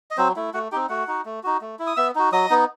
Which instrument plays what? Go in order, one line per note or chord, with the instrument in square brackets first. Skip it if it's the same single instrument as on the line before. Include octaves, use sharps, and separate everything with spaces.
[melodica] D#5
F#3 C4 C5
A3 E4
A3 F#4 F#5
C4 D#4 G4 G5
A3 F#4 F#5
D#4 F#4
A3
D#4 F#4
A3
E4
D#6
B3 E5 E6
D#4 F#4
F#3 D#5 D#6
B3 D#4